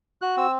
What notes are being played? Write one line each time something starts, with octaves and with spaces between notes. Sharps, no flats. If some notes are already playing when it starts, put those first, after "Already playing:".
F#4 F#6
C4 E6